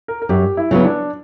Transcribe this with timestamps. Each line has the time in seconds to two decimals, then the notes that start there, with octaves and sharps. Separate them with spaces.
0.08 A#4
0.22 A#4
0.29 F#2 G4
0.57 E4
0.71 C#3 F#3 B3
0.85 D4